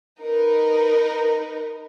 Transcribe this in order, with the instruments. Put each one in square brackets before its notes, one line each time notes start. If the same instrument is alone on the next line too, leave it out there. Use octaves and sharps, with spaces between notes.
[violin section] D#4 A#4 B4